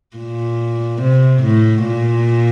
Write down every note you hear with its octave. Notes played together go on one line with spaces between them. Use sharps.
A#2
C3
A2
A#2